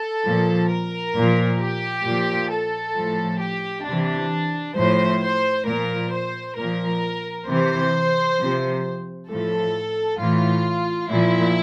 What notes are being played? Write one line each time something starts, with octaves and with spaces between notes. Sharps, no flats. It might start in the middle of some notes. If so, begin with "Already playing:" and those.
Already playing: A4
A#2 F3
A#4
A#2 F3
G4
A#2 F3
A4
A2 F3
G4
C3 E3 D4
A2 F3 C5
C5
A#2 F3 A#4
C5
A#2 F3 A#4
C3 E3 C5
C3 F3
A2 F3 A4
A2 E3 F4
A#2 F3 E4